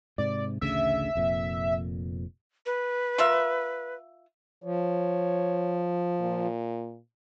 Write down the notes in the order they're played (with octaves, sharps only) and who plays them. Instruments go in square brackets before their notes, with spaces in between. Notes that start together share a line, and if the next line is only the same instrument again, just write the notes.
[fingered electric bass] G#2 C3 [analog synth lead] D5
[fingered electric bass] A1 D2 C#3 [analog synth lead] E5
[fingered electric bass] F1 F2 A#2
[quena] B4
[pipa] F4 A#4 E5
[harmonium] F3 [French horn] C#5
[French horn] A#2